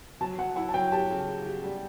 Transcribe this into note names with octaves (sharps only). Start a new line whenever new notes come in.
F#3 A5
F#3 F#5
E4 F#5
A5
F#3 G5
G4 A5
C#3
C#3
G4
G3